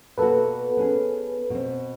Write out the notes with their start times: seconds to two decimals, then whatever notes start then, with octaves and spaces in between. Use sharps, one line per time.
0.18 B2 A#3 F#4 A4 B4
0.77 B3 C#4 G#4
1.50 B2 C4